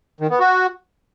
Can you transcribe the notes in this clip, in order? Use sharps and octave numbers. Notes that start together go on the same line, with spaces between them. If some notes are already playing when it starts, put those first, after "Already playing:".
D#3
B3
F#4